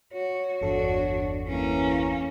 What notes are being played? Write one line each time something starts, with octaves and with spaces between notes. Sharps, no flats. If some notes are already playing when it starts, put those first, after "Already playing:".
F#4 C#5
G1 E2 D4 F#4 A4
E3 A#3 C#4